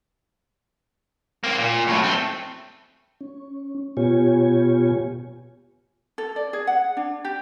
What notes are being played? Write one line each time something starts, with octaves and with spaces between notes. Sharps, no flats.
A#3 C4
A#2
F#2 A2
A3 C4
C#4
B2 B3 F4 G4 C#5 G#5
A4
D5
G#4
F#5
D4
G4